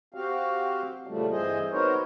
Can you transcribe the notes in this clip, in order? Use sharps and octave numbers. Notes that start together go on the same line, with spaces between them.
C4 F#4 G4 F5
A#2 C#3 F3 G3 A3
G2 E3 C4 G#4 C5 D#5
B3 D#4 F#4 A#4 C5 C#5